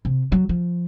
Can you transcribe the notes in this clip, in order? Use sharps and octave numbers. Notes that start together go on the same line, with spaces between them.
C3
F#3
F3